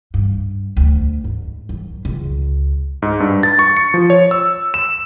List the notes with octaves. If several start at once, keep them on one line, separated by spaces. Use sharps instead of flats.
G2
D2
G#2
F#2
C#2
G#2
G2
A6
C#6
C#7
F3
C#5
E6
E7